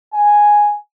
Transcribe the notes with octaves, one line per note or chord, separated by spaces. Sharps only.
G#5